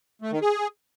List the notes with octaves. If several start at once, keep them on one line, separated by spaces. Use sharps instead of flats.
A3
D#3
G#4